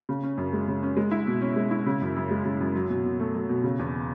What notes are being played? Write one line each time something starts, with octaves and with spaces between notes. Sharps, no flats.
C#3
C#4
F#2
G#3
C#3
C#4
G#3
E4
B2
C#4
G#3
E4
C#3
F#2
F#2
G#3
C#3
F#2
F#3
B2
B2
A3
F#3
B2
C#3
E2